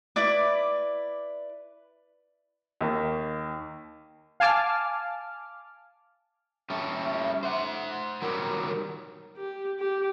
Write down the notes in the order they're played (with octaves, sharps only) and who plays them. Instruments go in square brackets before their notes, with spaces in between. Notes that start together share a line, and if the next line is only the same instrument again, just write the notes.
[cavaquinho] E4 B4 D5 D6
[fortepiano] D#2 A#3
[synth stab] F5 G#5 A5 D6 F6
[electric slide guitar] G3 C#4 A4 [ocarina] E5
[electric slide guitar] C5 F#5
[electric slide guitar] D#3 F#3 G3 [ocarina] A#4
[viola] G4
G4